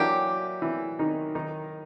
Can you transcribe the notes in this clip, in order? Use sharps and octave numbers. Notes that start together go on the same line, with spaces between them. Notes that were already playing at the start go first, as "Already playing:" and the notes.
Already playing: E3 F#3 A#3 D4 E4 G4
E3 E4
D#3 D#4
D#3 D#4